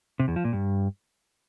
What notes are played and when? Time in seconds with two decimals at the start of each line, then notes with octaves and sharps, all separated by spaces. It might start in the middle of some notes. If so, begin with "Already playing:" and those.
0.19 C3
0.28 E2
0.36 F3
0.44 A#2
0.53 G2